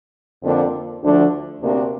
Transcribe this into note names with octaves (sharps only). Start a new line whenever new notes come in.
F2 D3 A#3 D4
D2 D3 F3 D4
D2 C3 A#3 D4